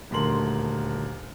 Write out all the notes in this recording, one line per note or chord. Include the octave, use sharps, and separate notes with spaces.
D#1 D2 A#4 C6 F#7